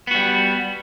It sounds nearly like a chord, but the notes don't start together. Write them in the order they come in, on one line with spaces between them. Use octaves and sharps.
B3 F#4 G3